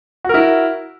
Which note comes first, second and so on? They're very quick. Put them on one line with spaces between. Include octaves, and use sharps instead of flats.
F#4 A#4 E4